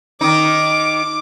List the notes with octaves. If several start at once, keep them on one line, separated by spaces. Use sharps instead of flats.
D#3 D#4 D6